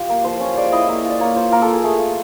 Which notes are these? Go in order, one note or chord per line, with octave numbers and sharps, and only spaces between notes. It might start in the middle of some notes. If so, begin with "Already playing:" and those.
Already playing: F4 G4
A#3
F3 C5
C#4
G#3 D5
E4 D#5
A#3 E5
D#5
F4
D5
A#3 C#5
F4 C5
A#3 A#4
A4
F4
G#4
A3 G#4
F4